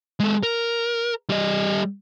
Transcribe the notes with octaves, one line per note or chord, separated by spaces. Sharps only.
G#3 A4
A#4
G3 D#5